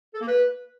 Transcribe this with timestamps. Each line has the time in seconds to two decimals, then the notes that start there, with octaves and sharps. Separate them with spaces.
0.14 A4
0.21 A#3
0.28 B4